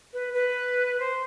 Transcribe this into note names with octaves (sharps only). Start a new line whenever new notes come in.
B4
B4
C5